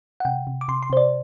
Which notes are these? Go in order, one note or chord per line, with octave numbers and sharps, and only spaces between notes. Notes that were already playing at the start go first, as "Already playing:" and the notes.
F#5
C3 G5
C3
D6
C3 C6
C6
C3 C5
D5